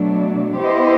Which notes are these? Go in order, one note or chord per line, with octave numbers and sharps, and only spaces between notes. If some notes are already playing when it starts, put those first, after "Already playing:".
Already playing: B2 F#3 A3 D4
B3 E4 G4 C5 D#5